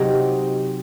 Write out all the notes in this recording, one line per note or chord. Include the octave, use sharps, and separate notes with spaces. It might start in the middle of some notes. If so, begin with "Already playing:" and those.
Already playing: C3 F#3 C4 D#4